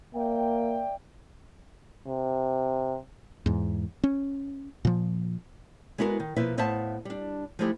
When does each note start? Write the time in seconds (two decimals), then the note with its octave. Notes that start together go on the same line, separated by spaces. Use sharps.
0.15 A#3 D5 E5 G5
2.07 C3
3.46 E2 G#2
4.04 C#4
4.85 A#2 F3
5.98 G#3 B3 E4 F#4 G4 A#4
6.20 D#3
6.36 B2 F3 A#3 E4 B4 E5
6.58 A2 B3 C5 E5 F5 A5
7.05 G3 D4
7.59 F3 G#3 A3 D#4 E4 G4